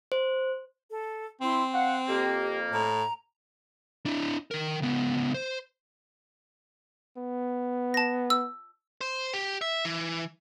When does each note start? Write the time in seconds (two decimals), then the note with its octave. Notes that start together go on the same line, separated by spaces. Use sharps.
0.12 C5
0.90 A4
1.41 C4 E4 C6
1.73 F5 F#5
2.08 F2 A#3 G4
2.71 A2 A#5
4.06 D4 E4
4.51 D#3 A#4
4.82 C#2 B3
5.34 C5
7.18 B3
7.94 A5 A#6
8.30 E6
9.01 C5
9.33 G4
9.62 E5
9.85 E3